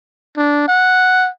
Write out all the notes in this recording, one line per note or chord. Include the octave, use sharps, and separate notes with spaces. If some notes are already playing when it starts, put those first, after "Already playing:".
D4
F#5